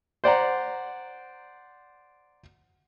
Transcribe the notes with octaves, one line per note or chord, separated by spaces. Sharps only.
C5 D5 F#5 A#5